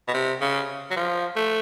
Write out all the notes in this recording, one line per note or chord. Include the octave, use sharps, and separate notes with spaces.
B2
C3
C#3
F#3
F3
A3